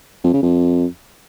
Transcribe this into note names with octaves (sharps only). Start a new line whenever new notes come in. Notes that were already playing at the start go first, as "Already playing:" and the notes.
F2
C#3
F2